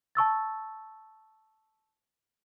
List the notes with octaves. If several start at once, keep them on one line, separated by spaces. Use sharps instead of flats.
A5 C#6 E6 A6